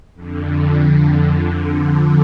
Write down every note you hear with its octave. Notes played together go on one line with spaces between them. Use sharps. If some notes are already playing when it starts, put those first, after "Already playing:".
F2 D3